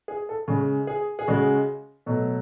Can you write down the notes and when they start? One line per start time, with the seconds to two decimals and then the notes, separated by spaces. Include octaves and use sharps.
0.08 G#4
0.29 A4
0.48 C#3 G#3
0.87 G#4
1.19 G#4
1.28 C#3 G#3 F#4
2.06 B2 F#3 A3